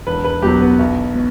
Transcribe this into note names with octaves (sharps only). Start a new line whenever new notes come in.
E1 B4
B4
E2 B2 F#3 G4
B3
B1
B2